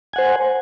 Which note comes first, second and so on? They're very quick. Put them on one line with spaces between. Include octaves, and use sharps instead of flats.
G#5 F#5 C5